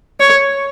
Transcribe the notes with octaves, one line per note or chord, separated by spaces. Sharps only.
C#5